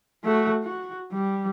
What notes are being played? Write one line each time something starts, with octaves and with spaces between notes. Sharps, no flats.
A3 F#4
F#4
G3